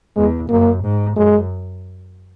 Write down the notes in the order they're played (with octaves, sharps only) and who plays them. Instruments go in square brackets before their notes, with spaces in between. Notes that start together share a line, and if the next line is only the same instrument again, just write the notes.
[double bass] E2 [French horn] G#3
[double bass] F#2 [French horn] A#3
[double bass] G#2
[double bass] F#2 [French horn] G#3